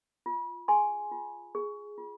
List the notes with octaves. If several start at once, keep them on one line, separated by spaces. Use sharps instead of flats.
F4
G#4 G#5 C6
F4
G#4
F4